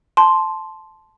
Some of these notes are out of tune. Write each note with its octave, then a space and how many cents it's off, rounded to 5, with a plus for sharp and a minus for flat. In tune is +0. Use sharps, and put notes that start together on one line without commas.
A5 -10 C6 +0